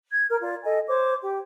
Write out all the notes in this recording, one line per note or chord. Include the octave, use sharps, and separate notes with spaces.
G#6
A#4 F6
F4 D5
A4 D#5 G#5
C5 C#5 D6
G4